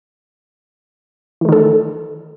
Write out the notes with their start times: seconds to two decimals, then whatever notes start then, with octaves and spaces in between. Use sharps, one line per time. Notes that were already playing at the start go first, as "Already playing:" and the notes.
1.41 E3
1.45 A3
1.49 D#3
1.52 A4